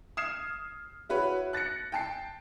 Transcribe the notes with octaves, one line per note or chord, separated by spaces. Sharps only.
D#6 F6 G#6 C7 E7
E4 F#4 B4 C#5
F#6 A6 A#6 C#7
G5 A5 C7